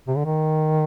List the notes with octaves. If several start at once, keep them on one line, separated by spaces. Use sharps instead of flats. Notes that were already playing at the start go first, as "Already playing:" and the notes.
C3
D3
D#3